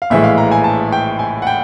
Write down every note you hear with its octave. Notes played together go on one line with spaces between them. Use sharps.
F5
A#1 A2 E3 G#3 E5
F5
A#5
G#5
A5
G5
G#5
F#5
G5